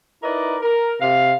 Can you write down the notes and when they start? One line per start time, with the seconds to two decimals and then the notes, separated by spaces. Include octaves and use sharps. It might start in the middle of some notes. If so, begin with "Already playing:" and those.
0.23 D#4 E4 A#4 B4 D5 D#5
0.62 A#4
1.00 C3 F5